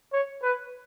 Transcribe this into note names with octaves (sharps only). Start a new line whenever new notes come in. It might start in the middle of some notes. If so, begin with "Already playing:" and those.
C#5
B4